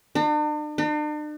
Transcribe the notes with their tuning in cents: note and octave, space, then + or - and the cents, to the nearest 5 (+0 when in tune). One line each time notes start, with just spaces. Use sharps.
D4 +45
D4 +45